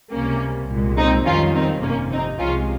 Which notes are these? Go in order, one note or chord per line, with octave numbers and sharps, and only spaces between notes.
C#2 C3 G3 A#3 C#4
C2 A#2 G#3
C4 D#4
F2 D#3 G3 C#4 F4
C4 D#4
G1 F2 C3 A#3 C#4
C4 D#4
C2 C3 F3 G#3 C#4 F4